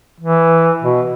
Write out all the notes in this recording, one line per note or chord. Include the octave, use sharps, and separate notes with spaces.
E3
B2